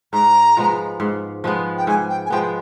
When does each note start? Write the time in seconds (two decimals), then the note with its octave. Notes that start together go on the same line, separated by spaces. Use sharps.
0.13 G#2 A#5
0.57 F3 G#3 B3
1.00 G#2
1.44 F3 G#3 B3
1.78 G5
1.87 G#2 G#5
2.09 G5
2.26 G#5
2.30 F3 G#3 B3 G5